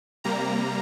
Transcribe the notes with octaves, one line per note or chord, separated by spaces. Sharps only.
C3 G3 A#3 A#5